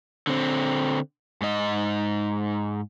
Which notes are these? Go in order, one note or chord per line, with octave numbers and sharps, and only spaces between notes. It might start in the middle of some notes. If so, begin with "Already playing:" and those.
D3 C4
G#2 D#5